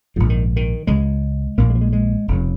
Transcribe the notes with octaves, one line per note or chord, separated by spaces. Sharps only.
A#1 G#2 F3
D#3
D#3
C#2 C#3 G#3
A#1 A#2 A#3
G#3
F3
G#3
G#3
F1 F2 C#3